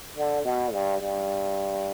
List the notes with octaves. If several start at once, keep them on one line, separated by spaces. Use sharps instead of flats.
D3
B2
G2
G2